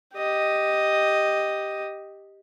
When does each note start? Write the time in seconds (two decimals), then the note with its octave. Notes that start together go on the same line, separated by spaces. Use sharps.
0.15 G4 D#5